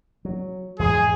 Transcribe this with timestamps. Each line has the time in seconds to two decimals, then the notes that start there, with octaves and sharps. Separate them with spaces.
0.25 F#3
0.79 E2 G#2 G#3 G#4